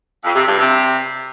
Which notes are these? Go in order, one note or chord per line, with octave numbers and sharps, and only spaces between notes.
F2
C3
G2
C3